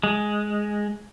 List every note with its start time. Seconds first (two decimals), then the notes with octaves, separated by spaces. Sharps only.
0.04 G#3